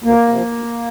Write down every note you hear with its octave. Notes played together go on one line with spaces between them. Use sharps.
D2 A#3
C3 F3
D2